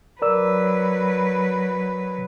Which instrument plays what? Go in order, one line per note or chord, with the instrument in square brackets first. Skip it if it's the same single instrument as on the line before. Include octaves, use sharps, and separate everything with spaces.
[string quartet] F#3 B4 [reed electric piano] A#4 D5 E6